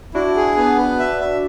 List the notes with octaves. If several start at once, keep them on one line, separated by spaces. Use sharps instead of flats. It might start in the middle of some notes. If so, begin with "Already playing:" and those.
D4 E4 F#4
G#4
B3
B4
E5
E5